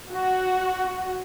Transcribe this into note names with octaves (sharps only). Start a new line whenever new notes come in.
F#4